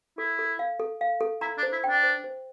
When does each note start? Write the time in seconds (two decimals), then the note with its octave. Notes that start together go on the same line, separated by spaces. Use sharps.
0.18 E4 A4
0.39 A4
0.59 F5
0.80 A4
1.01 F5
1.21 A4
1.41 E4 A#5
1.58 D4
1.63 C5
1.73 E4
1.84 D4 G5
2.03 C5
2.24 C5